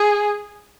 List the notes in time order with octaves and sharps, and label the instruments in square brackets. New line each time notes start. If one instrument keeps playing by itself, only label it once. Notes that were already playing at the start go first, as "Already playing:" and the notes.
Already playing: [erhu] G#4